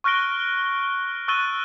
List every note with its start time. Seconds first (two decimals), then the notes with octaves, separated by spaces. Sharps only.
0.04 C#6 F6 F#6 A#6 D7 G7
1.28 C#6 E6 F#6 A6 D#7 G7